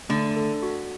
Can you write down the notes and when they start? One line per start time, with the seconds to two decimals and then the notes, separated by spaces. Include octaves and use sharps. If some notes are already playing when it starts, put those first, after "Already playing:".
0.09 D3 A3
0.37 A4
0.63 F#4